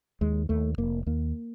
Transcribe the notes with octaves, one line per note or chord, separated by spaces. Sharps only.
D#2 G#3
D#2 A3
F1 A#3
D#2 A#3